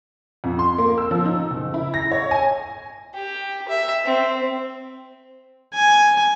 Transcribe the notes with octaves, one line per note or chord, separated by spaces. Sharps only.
F2
C6
A#3
E6
F3
D#4
F#1
E4
A#6
C#5
G#5
G4
E5
C4
G#5